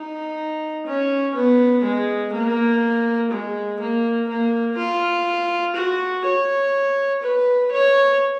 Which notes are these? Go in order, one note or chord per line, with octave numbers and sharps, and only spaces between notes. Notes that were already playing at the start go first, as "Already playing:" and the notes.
Already playing: D#4
C#4
B3
G#3
A#3
G#3
A#3
A#3
F4
F#4
C#5
B4
C#5